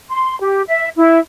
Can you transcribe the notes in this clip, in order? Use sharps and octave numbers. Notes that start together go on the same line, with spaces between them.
C6
G4
E5
E4